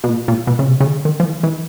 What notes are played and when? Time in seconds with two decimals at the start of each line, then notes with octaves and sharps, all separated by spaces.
0.04 B2
0.09 A#2
0.28 A#2
0.47 B2
0.59 C#3
0.67 C3
0.81 C#3
0.86 D3
1.05 D#3
1.20 F3
1.24 E3
1.43 E3